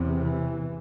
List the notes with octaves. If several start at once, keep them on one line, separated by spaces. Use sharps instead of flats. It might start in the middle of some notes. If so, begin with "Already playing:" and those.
Already playing: E2 C3
E3